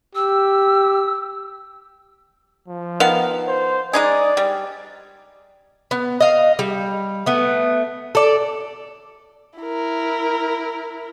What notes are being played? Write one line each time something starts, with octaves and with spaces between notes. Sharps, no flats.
G4 E6
F3
D#3 B3 F5
C5
G#3 D#4 G#4 D5
G3
B3
D#5 F5
G3
A3 B3
A4 D5
E4 A#4